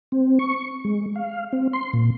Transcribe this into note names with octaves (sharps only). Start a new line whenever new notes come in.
C4
C#6
G#3
F5
C4
C6
A#2